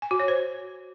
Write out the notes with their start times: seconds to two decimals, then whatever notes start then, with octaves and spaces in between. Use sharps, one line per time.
0.02 G#5
0.11 F#4
0.20 C#5
0.28 C5